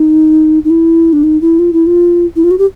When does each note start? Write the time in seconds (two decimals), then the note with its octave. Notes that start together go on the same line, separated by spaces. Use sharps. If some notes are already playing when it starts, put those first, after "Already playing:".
Already playing: D#4
0.64 D#4
0.70 E4
1.13 D4
1.24 D#4
1.41 E4
1.59 F4
1.73 E4
1.87 F4
2.36 E4
2.44 F4
2.51 F#4
2.58 G4